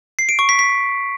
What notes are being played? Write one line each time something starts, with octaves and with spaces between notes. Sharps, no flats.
C7
D7
C#6
B6
B6